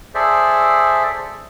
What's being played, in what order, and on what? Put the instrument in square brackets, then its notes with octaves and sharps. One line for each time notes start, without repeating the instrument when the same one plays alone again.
[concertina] G#4 A4 C5 D5 E5